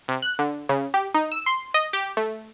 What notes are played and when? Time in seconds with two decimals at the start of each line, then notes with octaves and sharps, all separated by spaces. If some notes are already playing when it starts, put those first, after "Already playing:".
0.08 C3
0.22 F#6
0.39 D3
0.69 C#3
0.94 G4
1.14 D#4
1.32 E6
1.46 C6
1.74 D#5
1.93 G4
2.17 A3